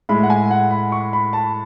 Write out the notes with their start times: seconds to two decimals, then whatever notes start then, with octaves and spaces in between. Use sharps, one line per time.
0.09 A2 G#3 B5
0.23 F#5
0.30 G#5
0.51 F#5
0.71 B5
0.92 C#6
1.13 B5
1.33 A5